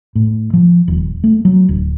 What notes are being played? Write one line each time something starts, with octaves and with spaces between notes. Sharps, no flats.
A2
F3
D#1
A3
F#3
D1